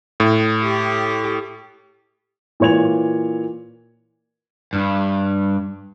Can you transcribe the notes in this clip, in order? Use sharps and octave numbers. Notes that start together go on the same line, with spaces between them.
A2
G4
A#2 E3 C#5 G#6 F7
G2